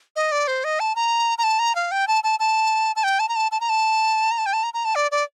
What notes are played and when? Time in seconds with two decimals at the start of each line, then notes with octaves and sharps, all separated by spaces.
0.16 D#5
0.32 D5
0.47 C5
0.64 D#5
0.80 A5
0.96 A#5
1.38 A#5
1.44 A5
1.59 A#5
1.75 F5
1.91 G5
2.07 A5
2.24 A5
2.39 A5
2.96 A5
3.03 G5
3.19 A5
3.29 A#5
3.36 A5
3.51 A5
3.60 A#5
3.69 A5
4.31 A#5
4.38 A5
4.46 G5
4.53 A5
4.63 A#5
4.74 A#5
4.85 A5
4.95 D5
5.11 D5